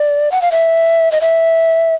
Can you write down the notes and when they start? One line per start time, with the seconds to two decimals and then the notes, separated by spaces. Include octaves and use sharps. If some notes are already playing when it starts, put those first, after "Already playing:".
Already playing: D5
0.32 F#5
0.42 F5
0.52 E5
1.12 D#5
1.21 E5